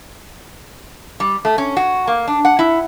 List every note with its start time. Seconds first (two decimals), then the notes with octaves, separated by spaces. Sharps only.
1.20 G3
1.45 A3
1.58 C#4
1.77 F#4
2.08 A#3
2.27 D4
2.45 F#5
2.59 E4